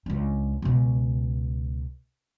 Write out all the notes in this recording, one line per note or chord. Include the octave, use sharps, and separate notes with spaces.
C#2 D4
C#2 B2